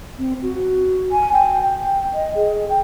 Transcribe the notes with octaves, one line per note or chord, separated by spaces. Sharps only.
C4
F#4
G#5
G5
G5
D#5
G#4
G5